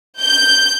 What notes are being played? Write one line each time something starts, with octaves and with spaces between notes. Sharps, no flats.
G6